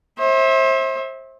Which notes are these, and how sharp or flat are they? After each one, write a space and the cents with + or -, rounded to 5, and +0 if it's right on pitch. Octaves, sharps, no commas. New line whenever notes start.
C5 +35 E5 -25